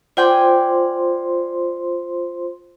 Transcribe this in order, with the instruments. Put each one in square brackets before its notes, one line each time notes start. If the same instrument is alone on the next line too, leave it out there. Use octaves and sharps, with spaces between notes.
[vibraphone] F4 C5 C6 [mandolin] D5 G5 G#5